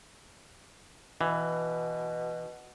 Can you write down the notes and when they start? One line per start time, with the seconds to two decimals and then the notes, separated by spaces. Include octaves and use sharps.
1.21 B2 E3